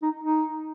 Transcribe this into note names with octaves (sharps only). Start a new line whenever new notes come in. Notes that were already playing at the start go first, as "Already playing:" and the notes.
D#4
D#4